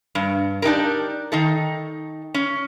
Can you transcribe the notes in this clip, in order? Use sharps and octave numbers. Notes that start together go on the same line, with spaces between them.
G2
D4 D#4 G4 A#4
D#3 D#4 A4
C#4